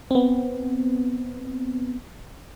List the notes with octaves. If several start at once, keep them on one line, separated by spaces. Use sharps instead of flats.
B3 C4